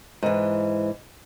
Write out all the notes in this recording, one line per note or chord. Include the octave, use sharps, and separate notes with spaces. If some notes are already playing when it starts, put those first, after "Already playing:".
G#2 E3